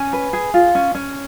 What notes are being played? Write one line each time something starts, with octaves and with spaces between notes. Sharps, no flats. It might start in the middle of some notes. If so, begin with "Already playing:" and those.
Already playing: C#4 G#5
B4
G#4
F4
C#4
C#4